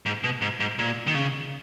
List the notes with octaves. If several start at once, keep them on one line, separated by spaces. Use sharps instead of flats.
G#2
B2
G#2
G#2
A#2
D#3
C#3